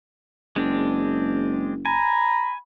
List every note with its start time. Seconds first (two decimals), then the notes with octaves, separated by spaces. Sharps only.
0.56 F#1 G#3 C4 D4
1.86 G#5 A#5 B5